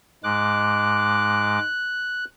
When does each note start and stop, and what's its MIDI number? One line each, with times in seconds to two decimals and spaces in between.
0.24 1.59 44
0.24 1.59 56
0.24 1.59 86
0.24 2.25 90